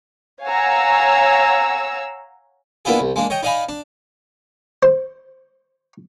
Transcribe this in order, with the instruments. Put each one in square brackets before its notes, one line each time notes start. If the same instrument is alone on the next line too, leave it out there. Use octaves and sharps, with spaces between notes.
[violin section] C#5 F5 F#5 G#5 A#5 E6
[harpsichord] A#3 B3 D4 E4 F4 G#4
C2
G#3 A#3 D4
C#5 D#5 G5
D#4 D5 D#5 F5 G#5 B5
D4
C5